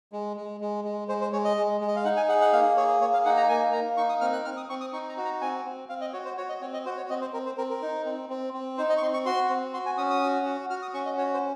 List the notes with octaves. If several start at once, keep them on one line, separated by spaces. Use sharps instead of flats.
G#3
G#3
G#3
G#3
G#3 C5
C5
G#3 C#5
D#5
G#3
G#3
D#5
F5
D#4 F#5
G#5
G#4 F#5
F#5
A#3 F5
G#4 C#5
A#3 C#5
F5
D#4 F#5
A#5
A#3 G#5
A#3 A#5
D#4 C#6
D#6
C4 F6
F#6
C4 F6
D#6
C4 C#6
D#6
D#4 C#6
A#5
F#4
A#5
C4 G#5
C4
C4 F5
D#5
F#4 C#5
C5
F#4 C#5
D#5
C4 C#5
D#5
F#4 C5
C#5
C4 D#5
C5
C4 A#4
C5
C4 A#4
A#4
D#4
C4
C4
C4
D#4 C5
D#5
C#6
C4 C6
C#6
F#4 C6
C4
F#4 C6
G#5
C#4 D#6
D#6
F#4
F#4
F#4 F6
D#6
C#4 C#6
D#5
F#4 C#5
C5